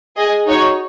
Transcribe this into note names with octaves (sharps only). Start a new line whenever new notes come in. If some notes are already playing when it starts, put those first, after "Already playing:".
G#4 D#5 G#5
D#4 F#4 C#5